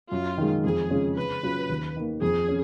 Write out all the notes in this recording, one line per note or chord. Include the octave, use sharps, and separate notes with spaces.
F#2 F4
D#3 G#3
F2 G#4
C#3 G#3 C#4 F4
C#3 B4
F#3 C#4 F4
D#2
D#3 A#3
F2 G#4
C#4